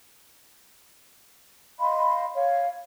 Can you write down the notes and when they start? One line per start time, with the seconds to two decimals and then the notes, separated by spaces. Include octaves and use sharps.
1.79 D#5 F5 B5 C6
2.34 C#5 F5